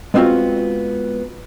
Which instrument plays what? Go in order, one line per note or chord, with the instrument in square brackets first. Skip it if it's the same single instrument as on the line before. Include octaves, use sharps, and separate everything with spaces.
[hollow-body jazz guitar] G#3 B3 C4 D#4 F4 F#4